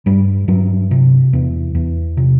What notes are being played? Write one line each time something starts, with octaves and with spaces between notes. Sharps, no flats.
G2 G3
G2 F#3
C3
E2
E2
C3